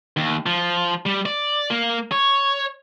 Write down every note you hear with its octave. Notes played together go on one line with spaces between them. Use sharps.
D#2
F3
G3
D5
A#3
C#5